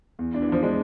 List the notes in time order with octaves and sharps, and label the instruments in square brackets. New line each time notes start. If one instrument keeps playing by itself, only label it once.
[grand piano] E2
D4
[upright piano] E3
[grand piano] E2 [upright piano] F3
[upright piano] G#3 [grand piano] D4